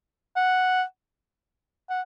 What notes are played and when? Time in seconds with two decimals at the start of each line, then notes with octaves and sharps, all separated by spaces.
0.36 F#5
1.90 F#5